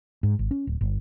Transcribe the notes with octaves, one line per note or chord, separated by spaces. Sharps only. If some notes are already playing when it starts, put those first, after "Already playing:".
G#2
G#1
C#4
D1
G1